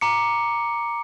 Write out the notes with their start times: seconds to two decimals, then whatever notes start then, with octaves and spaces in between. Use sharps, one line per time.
0.01 A#5 D6 C#7